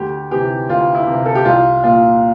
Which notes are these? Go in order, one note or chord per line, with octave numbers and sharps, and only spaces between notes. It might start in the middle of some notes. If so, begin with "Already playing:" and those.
Already playing: D2 G4
C3 E3 G4
D2 F4
E4
C3 E3
A4
G4
C2 F4
A#2 F4